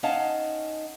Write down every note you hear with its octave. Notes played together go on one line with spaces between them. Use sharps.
C#4 D#4 D#5 F5 F#5 A5